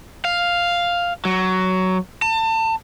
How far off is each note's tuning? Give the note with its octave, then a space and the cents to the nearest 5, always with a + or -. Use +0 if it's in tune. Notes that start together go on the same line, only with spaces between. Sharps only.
F5 +0
F#3 +10
A5 +30